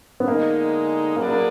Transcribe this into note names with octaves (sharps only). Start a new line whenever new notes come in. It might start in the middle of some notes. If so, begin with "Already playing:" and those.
B3
D3 G#3 A#3 D#4
F#3 A#3 D4 G#4 B4 D5
A#3